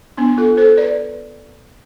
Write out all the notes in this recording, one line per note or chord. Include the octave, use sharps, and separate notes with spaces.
B3 D4
F4 A4
A4 C5
B4 D5